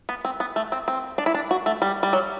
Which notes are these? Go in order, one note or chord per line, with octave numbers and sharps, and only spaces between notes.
B3
C4
B3
A3
C4
C4
D4
E4
D4
F#4
A3
G3
G3
F#3